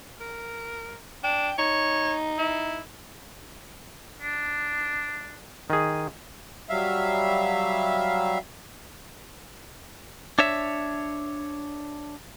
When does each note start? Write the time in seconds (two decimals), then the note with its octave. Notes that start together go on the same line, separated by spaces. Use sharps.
0.21 A#4
1.24 D4 G5
1.58 D#4 C#5
2.38 E4
4.22 D4
5.70 D#3 G#4 D#6
6.70 F#3 G3 E5 F5
10.39 D4 C#5 E5